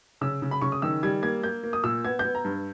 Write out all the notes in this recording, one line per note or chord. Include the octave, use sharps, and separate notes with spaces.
C#3 E6
C#3
B5
C#3 C#6
D#6
D#3 E6
G3 G#6
A#3 G#6
A#3 G6
A#3
D#6
A#2 E6
B3 G#6
G6
B3
A#5
G2